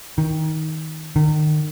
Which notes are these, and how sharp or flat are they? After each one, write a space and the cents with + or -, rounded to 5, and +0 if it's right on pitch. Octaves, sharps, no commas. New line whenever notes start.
D#3 +20
D#3 -30